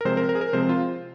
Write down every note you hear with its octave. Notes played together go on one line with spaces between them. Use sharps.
A#4
C3 F3 G#3 C4 C5
A#4
A#4
G#4
A#4
C3 F3 G#3 C4 C5
F4